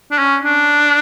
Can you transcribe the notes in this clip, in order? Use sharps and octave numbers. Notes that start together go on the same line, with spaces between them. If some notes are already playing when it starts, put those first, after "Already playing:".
D4
C#4
D4